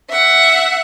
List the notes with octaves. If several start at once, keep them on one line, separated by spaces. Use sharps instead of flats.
E5 F#5